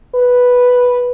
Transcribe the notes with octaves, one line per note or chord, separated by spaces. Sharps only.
B4